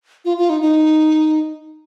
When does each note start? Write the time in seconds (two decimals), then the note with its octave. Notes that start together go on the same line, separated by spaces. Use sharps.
0.25 F4
0.38 F4
0.50 D#4
0.62 D#4